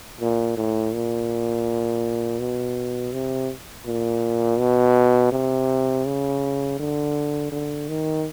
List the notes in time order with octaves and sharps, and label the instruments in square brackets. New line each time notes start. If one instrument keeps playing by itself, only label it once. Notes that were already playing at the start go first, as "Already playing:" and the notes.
[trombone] A#2
A2
A#2
B2
C3
A#2
B2
C3
C#3
D3
D3
D#3